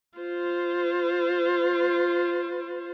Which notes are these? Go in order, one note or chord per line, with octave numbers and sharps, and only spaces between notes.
F4 C5